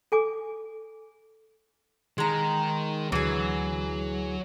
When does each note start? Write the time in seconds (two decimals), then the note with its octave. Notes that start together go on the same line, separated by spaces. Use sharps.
0.12 A4 G#5 D6
2.18 D#3 G#3 A#5
3.12 D2 E3 F#3 G#4